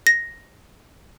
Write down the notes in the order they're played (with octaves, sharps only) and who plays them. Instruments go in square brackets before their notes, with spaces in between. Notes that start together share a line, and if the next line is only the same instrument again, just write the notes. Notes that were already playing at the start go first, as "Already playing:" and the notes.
[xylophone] A#6